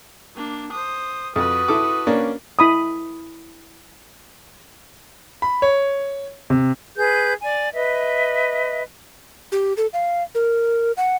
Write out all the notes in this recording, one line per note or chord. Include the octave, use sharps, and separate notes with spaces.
A#3 D4
C5 D#6
F2 F#4 B4 D#6
E4 A4 D6
A#3 C#4 D4
E4 B5 D#6
B5
C#5
C3
G#4 B4 G6
D5 G#5
B4 D#5 E5
G4
A4
F5
A#4
F#5